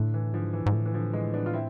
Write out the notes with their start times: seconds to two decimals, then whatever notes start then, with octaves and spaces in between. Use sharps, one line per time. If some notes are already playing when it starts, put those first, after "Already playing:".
Already playing: A2 D3
0.14 E3
0.34 G#2 D3 F3
0.53 E3
0.66 G#2
0.74 A2
0.86 E3
0.94 D3 F3
1.13 E3 G#3
1.34 B3 D4
1.46 F4
1.53 C4 E4